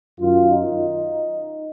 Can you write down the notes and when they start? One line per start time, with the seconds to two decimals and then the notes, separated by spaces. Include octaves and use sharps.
0.19 F#2 D#3 F4
0.50 D#4